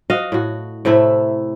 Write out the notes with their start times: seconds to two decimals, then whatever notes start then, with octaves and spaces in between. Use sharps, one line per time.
0.10 F#4 D#5 F5
0.32 A2 F#4
0.85 A2 C3 A3 E4